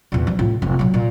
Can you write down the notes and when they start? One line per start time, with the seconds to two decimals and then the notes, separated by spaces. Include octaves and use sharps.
0.12 E2 A#2
0.27 F3 G3
0.39 A2 F4
0.62 F1
0.79 A#2 F#3
0.94 A#2